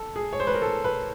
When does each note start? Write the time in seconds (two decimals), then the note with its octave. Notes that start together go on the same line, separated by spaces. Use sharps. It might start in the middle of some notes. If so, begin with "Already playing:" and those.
Already playing: A4
0.16 G#4
0.33 C#5
0.40 C5
0.47 B4
0.54 A#4
0.62 A4
0.84 B4